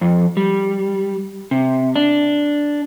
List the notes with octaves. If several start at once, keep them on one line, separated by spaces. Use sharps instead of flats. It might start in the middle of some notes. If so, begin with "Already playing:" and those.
F2
G3
C3
D4